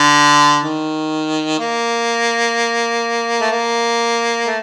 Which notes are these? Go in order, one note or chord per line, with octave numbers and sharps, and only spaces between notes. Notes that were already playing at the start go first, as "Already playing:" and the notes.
Already playing: D3
D#3
A#3
A3
A#3
A3